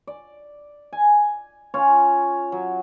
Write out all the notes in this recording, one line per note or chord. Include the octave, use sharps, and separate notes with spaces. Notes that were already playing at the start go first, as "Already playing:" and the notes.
D5
G#5
C#4 F4 C#5
F#3